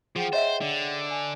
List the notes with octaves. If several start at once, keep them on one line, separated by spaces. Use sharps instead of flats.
F3 G#4 F#5 G5
C5 C#5 D#5 E5
D3
G#5